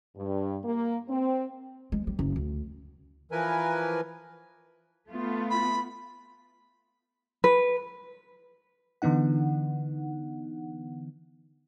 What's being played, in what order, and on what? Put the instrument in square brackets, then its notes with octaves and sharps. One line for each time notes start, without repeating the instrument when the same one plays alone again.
[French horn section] G2
A#3
C4
[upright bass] G#3
G3
F#1
D2
[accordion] E3 F3 A#4 B4 G#5
[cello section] A3 B3 F4
[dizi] B5
[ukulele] B4
[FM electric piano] D3 E3 B3 D#4 F#5